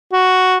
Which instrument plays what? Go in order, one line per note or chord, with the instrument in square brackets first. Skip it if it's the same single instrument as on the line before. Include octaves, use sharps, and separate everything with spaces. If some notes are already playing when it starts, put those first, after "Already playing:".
[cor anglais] F#4